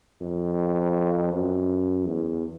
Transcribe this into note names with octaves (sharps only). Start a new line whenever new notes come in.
F2
F#2
E2